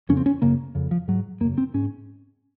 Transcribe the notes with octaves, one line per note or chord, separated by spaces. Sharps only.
F2 C#3 C#4
C4
C#4
F#2 C#3 A#3
F2 C#3
F3
G#2 F#3
F#2 C#3 A#3
C4
G#2 C#4